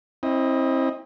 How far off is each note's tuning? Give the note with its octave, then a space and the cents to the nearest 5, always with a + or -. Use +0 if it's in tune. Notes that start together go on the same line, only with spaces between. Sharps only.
C4 +25 E4 -15 D#5 +0